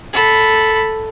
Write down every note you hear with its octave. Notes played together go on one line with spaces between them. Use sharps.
A4 B5